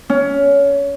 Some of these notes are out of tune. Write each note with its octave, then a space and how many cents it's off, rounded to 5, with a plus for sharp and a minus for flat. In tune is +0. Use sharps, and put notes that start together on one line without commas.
C#4 +20